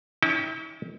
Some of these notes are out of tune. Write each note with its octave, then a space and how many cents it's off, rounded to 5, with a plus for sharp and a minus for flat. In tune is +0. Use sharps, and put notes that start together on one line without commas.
C#4 +40 E4 -45 G5 +0